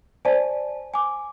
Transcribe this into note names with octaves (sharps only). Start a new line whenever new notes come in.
C5 D5 G#5 A5
G#5 D6